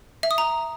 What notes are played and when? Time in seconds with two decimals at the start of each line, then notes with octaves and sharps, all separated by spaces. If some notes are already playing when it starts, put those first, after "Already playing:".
0.23 E5
0.31 D#6
0.38 A#5